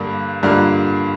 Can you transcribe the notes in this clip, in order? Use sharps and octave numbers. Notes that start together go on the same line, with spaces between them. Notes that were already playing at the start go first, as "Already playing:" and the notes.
Already playing: G2 D3 A#3
G2 D3 A#3 F4